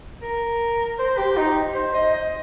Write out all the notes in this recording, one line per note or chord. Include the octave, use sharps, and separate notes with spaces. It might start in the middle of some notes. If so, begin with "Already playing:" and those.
A#4
C5
G4
D#4
C5
D#5
D#5